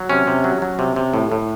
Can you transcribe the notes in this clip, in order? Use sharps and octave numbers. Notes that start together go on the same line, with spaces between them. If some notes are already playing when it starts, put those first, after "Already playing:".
Already playing: F#3
C3 C#4
C3
F#3
F#3
C3
C3
A2
A2